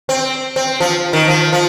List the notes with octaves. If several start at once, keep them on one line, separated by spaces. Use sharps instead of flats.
C4
C4
F3
D#3
F3
F3